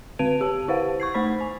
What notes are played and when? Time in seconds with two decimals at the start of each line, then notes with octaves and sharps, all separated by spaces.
0.19 D3 C4 B4 D7 D#7 F7
0.41 G4 A5
0.68 E4 G4 B4 C5 F5 F#5
1.00 C#6 G#6 C7
1.14 A3 C5 B5 B6
1.41 G#5